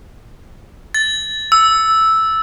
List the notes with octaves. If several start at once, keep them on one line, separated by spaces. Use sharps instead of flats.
A6
E6